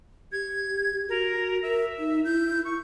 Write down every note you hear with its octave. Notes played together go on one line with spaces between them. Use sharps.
G4 G#6
F#4 A#4
A#4 E5
D#4
E4 G6
C#6